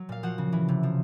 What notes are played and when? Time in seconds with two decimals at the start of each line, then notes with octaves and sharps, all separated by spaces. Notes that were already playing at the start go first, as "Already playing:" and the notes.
Already playing: F#3
0.09 A#2 F5
0.23 F3 F#4 F#5
0.38 C#3
0.52 E3
0.68 C3
0.83 F3